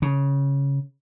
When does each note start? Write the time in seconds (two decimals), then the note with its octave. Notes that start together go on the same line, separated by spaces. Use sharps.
0.02 C#3